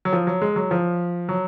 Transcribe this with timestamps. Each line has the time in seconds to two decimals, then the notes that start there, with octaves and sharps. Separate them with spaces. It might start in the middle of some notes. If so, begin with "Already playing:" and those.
0.05 F#3
0.13 F3
0.27 F#3
0.42 G#3
0.56 F#3
0.71 F3
1.29 F#3